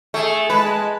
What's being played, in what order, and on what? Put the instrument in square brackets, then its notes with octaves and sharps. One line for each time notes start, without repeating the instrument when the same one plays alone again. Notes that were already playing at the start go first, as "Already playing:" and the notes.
[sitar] A3 [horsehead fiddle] G#4
[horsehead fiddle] G#3 A5 [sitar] B4